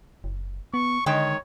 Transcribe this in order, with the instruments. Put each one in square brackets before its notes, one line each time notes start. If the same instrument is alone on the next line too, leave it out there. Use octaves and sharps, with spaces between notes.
[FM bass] F#1
[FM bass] B3 [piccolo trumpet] C#6
[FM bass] D3 [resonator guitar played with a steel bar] D#3 G#3 G5 [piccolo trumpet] C#5